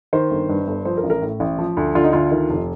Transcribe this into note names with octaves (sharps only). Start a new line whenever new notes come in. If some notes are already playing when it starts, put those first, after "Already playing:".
D#3 C5
G1
G2
G1
F3 C5
A#4
A1
A#4
A2
A1
F3
D2
D3 F4
D#4
D2 F4
D#3
F1